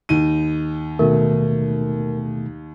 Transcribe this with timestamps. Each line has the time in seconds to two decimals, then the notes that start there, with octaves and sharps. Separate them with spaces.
0.09 D#2 D#4 D#7
0.99 B2 D#3 A3 A#4